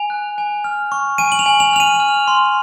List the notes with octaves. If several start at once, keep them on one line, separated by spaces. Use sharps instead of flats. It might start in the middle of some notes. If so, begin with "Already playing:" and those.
Already playing: G#5 F7
F#6
G#5
F6
C#6
G#5 D#7
F#7
F7
G#5
F7
F6 F7
D#7
F6
C6